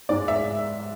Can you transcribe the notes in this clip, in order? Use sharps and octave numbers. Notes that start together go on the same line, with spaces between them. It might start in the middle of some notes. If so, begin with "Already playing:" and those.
G#2 G#3 D5
E5